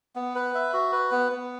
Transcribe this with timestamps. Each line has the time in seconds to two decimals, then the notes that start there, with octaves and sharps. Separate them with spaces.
0.16 B3
0.35 B4
0.55 E5
0.73 F#4
0.92 B4
1.11 B3
1.32 B3